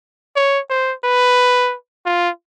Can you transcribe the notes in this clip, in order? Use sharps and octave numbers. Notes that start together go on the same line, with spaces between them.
C#5
C5
B4
F4